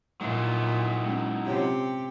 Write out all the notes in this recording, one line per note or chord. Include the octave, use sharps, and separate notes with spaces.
A#2 F#3 D#4 E4
G#3 C#4
C3 C#4 F4 G4 C#5